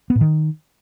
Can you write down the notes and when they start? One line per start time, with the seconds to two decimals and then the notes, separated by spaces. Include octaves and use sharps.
0.10 B3
0.15 A2
0.21 D#3